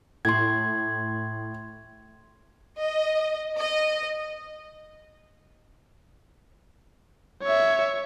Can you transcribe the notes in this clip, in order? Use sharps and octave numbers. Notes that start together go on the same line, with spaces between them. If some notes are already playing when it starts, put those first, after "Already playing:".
A2 C6 G#6
D#5
D#5
C#5 E5